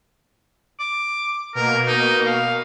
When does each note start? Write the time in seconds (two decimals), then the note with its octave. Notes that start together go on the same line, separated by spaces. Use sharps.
0.79 D6
1.55 B2 A#3 A#4
1.87 D#4
2.26 F5